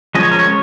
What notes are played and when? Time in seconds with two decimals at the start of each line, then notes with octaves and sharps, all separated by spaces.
0.15 F3 G#3 C#4 D#5
0.23 C#5
0.31 A#4
0.39 C#5